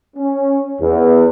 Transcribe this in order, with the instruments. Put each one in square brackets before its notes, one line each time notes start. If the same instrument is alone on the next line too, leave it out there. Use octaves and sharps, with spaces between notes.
[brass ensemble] C#4
E2